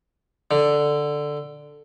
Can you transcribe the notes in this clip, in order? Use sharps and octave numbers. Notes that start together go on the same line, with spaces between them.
D3